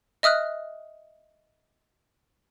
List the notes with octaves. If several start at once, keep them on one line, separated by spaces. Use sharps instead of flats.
D#5 E5 D#6 F6 F#6